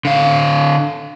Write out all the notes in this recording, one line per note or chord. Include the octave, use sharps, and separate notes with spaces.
D3 F5